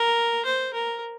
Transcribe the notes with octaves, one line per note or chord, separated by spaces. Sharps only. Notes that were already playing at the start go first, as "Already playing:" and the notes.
Already playing: A#4
C5
A#4